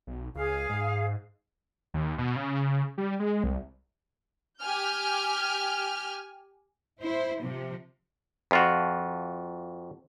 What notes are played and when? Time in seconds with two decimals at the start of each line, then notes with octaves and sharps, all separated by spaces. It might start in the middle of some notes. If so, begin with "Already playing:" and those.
0.07 B1
0.35 C#2 G#4 F5
0.69 G#2
1.94 D#2
2.18 B2
2.36 C#3
2.98 G3
3.20 G#3
3.44 C2
4.61 G4 G#5 F6 G6
7.01 E4 C5
7.42 C3 F3
8.51 F2 F4 F#4